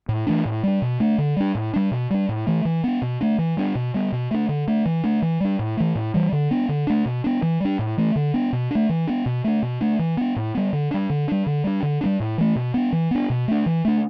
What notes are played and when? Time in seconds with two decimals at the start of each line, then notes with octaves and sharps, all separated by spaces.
0.09 A2
0.27 E3 A3 D4
0.45 A2
0.63 G3 D4
0.82 B2
1.00 A3 D4
1.18 D3
1.37 G3 D4
1.55 A2
1.73 G3 D4
1.91 B2
2.10 G3 D4
2.29 A2
2.47 E3 A3
2.65 E3
2.84 B3 D4
3.02 B2
3.21 A3 D4
3.38 E3
3.57 G3 B3 D4
3.75 B2
3.94 G3 B3
4.12 B2
4.31 A3 D4
4.49 D3
4.67 A3 D4
4.86 E3
5.04 A3 D4
5.22 E3
5.40 G3 D4
5.59 A2
5.77 E3 A3
5.95 A2
6.14 E3 G3
6.32 D3
6.51 B3 D4
6.69 D3
6.87 A3 D4
7.05 B2
7.24 B3 D4
7.42 E3
7.60 G3 D4
7.79 A2
7.98 E3 A3
8.16 D3
8.34 B3 D4
8.53 B2
8.70 A3 D4
8.89 E3
9.07 B3 D4
9.26 B2
9.44 A3 D4
9.62 B2
9.81 A3 D4
9.99 E3
10.17 B3 D4
10.36 A2
10.55 G3 B3
10.73 D3
10.91 G3 D4
11.10 D3
11.28 G3 D4
11.46 D3
11.64 G3 D4
11.83 D3
12.01 G3 B3 D4
12.20 A2
12.38 E3 A3
12.56 B2
12.74 B3 D4
12.92 E3
13.11 B3 D4
13.30 B2
13.48 A3 D4
13.66 E3
13.85 A3 D4